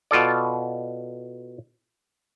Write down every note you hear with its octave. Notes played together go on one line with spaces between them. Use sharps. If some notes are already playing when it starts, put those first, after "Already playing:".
B2 F4 A4 D5